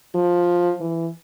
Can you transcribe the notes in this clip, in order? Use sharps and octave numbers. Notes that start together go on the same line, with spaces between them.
F3
E3